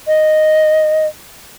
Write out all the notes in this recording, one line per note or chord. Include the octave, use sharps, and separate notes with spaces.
D#5